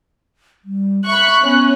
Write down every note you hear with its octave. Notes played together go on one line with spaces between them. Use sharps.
G3
E5 B5 C#6 F#6
B3 C#4